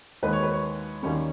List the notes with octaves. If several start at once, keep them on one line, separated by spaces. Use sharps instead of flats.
D#2 D#3 G#3 B4
C#5
B4
C#5
D#2 D#3 G3 C#4 C#5